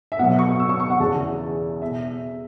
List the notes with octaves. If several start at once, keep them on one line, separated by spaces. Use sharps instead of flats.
E5
B2 F#3 B3 F#5
C#6
E6
C#6
C#6
F#5
E2 C#3 E3 A5
B2 E5